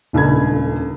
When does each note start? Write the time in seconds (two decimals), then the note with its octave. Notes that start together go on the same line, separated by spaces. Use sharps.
0.13 D#1 C#2 D4 A4 B5 G#6